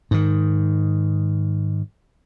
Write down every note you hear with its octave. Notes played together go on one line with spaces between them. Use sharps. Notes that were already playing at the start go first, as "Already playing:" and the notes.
G#2 D#3